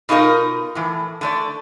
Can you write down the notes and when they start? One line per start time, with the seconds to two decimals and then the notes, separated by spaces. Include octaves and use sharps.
0.09 B2 D#4 F4 G4 A#4 D#5
0.75 A2 E3
1.21 D3 A3 D5